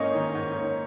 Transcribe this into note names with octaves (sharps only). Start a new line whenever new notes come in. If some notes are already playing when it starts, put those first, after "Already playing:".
Already playing: G#2 A#3 C#4 C#5 D#5
D#3
G#2
A#3 C#5